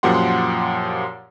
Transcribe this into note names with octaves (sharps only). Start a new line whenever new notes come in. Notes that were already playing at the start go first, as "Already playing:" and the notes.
F#2 A#2 F3 G4 F#5 C6